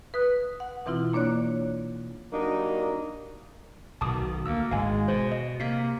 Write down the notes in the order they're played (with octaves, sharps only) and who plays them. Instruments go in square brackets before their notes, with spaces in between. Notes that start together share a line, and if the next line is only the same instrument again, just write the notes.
[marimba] B4 D#6 F#6
F#5
B2 E3 C4 E4 F4
A#3 D4 C#5 D5 F#6
[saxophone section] F#3 G3 A#3 D4 D#4
[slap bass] B1 B2 D#3 [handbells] A5 D6 D#6
[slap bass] D2 [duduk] A#3 [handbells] E6
[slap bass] G#1 [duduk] G#3 [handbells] F5 G#5
[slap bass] B2 [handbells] C5
[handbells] D#5
[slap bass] C3 [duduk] A#3 [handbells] B6 C7